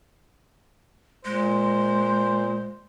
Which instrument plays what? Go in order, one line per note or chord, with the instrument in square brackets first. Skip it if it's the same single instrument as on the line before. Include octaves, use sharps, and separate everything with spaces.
[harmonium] A#2 [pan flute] G#3 [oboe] C5